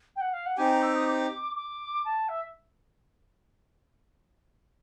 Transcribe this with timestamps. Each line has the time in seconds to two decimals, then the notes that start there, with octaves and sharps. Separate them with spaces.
0.16 G5
0.21 F#5
0.33 F5
0.46 F#5
0.58 C4 D#4 G4 G#5
0.71 A#5
0.82 E6
0.95 D#6
1.08 D6
1.56 D6
2.05 A5
2.29 E5